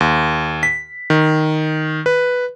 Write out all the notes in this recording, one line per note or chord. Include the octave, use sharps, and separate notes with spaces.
D#2
B6
D#3
B4